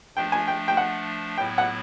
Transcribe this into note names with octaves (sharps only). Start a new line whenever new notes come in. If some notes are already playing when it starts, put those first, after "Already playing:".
F3 A3 D4 G5
G#5
G5
G5
F#5
A2 F#3 B3 E4 G5
F#5